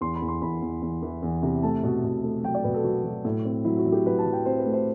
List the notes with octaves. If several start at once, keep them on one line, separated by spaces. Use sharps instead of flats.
E2 C6
B5
E2
C6
E2 B5
E2
E2
E3
E2
C3
A3 A5
B2
B2
A3
F#3 G5
D5
B2 B4
A4
F#3 F#4
F#3
A2
C4
F#3 E4
F#4
F#3
G4
F#3 B4
A5
F#3
G5
C4 C5
B4
A3
C5